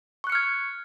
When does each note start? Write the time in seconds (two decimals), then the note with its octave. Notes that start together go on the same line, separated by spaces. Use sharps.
0.24 C#6
0.27 F#6
0.30 C#7
0.32 F6
0.35 G#6